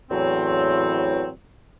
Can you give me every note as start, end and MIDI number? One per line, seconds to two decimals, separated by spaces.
0.11 1.29 40
0.11 1.29 45
0.11 1.29 52
0.11 1.29 54
0.11 1.29 60